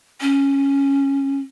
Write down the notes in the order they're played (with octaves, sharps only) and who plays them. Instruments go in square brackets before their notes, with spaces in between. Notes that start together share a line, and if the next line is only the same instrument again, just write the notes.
[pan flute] C#4